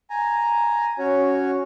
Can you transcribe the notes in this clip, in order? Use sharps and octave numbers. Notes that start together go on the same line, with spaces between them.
G#5 A#5
C#4 F#4 C#5